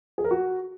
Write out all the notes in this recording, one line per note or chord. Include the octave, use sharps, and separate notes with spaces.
G#4
A#4
F#4